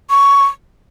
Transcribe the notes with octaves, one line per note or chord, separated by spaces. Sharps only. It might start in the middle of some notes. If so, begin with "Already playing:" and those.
C#6